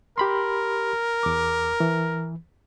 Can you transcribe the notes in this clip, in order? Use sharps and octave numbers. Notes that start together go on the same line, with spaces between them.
G4 A#4 B5 C6
E2 D6
E3